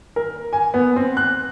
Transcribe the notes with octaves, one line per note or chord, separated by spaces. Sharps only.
A#4
G#5
B3
C4
F#6